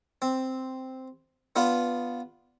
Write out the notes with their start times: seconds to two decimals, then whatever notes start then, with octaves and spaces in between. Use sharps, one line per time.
0.22 C4
1.56 B3 D4 F4 B4